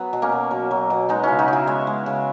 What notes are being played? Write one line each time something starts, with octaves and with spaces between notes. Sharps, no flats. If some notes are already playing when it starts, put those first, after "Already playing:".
Already playing: F#3 B3
B2
A#3 C#4
B2
F#3
F#3
B2
G#3 B3 D#4
C#3 C#4 E4
D#4 F#4
C#3 E4 G#4
G#3 C#5 E5
G#3
C#3